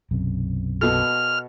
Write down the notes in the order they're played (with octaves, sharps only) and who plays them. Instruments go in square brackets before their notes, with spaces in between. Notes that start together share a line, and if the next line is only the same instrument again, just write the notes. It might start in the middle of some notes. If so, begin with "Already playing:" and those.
[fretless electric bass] B1 F#2 C3
[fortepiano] B2 A4 [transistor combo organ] F6